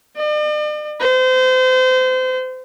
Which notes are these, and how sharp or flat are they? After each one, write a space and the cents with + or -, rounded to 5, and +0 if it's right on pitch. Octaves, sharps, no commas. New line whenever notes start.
D5 +45
C5 -30